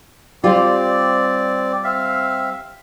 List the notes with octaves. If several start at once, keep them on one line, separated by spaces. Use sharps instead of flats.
G3 C4 F4 D5
C4 E5 F5